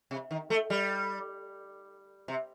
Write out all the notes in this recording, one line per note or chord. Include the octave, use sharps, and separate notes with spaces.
C3
D#3
A3
G3
C3